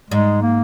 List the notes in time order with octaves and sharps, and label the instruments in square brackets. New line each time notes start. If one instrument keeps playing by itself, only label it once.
[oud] G#2 [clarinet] G#3
[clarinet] A#3